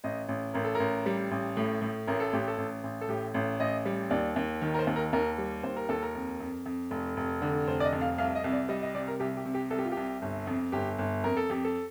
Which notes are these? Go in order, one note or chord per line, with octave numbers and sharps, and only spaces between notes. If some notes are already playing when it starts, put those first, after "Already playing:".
A1 D#5
A1
A1 A#4
A4
A#4
A1
G3
A1
A2
A2
A1 A#4
A4
A1 G4
A4
A1
A1
A4
A2 G4
A1
A1 D#5
G3
D#2 D5
D#2
D#3
A#4
C5
D#2
A#4
D#2 A#4
G3
D#2 C5
A#4
D#2 A4
A#4
F2
F2
F2
F1
F1
D3
F1 C5
D5
D#5
F2
F5
C2 F5
D#5
C2
D5
G3 D#5
D#5
C3 D5
A#4
C2 G4
G4
C3
G4
C2 A4
G4
F4
C2 G4
G1
F2
G1 G4
G1
F2 A#4
A4
F2 G4
A4